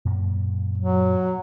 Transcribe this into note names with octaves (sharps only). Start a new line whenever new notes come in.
F#2 A#2 A#3
F#3